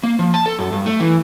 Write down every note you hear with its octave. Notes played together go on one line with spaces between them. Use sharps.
A#3
F3
A5
A4
F#2
G2
A3
E3